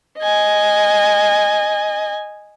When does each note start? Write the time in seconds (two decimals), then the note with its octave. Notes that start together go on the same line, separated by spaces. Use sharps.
0.18 D#5 G#5